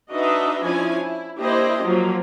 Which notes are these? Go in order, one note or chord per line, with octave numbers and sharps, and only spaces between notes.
D4 D#4 F#4 B4 D#5 E5
F3 C#4 D4 E4 G#5
E4
A#3 D4 E4 G4 C5 D#5
F3 F#3 A#3